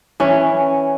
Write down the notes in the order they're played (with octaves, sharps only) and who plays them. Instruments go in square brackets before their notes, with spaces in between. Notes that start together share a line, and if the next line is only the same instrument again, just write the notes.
[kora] E3 C#4